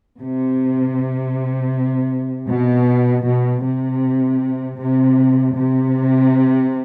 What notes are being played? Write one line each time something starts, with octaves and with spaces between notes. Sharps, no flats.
C3
B2
B2
C3
C3
C3